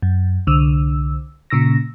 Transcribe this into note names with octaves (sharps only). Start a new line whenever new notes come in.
F#2
C2 D3 E6
A#2 C#3 E6 A#6